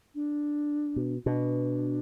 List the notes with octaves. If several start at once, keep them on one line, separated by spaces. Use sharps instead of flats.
D4
B2
B2 D4